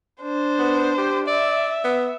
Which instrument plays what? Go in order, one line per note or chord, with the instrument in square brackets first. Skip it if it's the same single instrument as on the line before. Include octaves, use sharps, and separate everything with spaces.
[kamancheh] D4 C5
[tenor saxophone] B3
G4
[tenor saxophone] D5 [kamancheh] E5
[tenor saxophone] B3